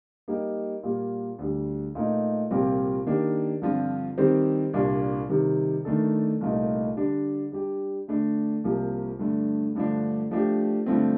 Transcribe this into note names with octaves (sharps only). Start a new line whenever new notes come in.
G3 A#3 D#4 G4
A#2 G3 A#3
D2 D3 G3
A#2 A3 D#4
C2 A#2 F3 C4 G4
D#3 A#3 D4 G4
G2 D3 F3 C4 F4
D#3 G3 C4 G4 C5
C2 A#2 G3 D4
C3 D#3 G3
D#3 A3 D4 A4
C2 A#2 A3 D#4
D3 G3 D4
G3 D4 G4
D3 A3 D4
C2 C3 F3 A#3
G2 D3 A3
G2 D3 F3 A3 D4
F3 A3 D4 G4
G2 D3 F3 A3 C4